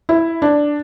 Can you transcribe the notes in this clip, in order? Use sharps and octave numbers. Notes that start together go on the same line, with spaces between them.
E4
D4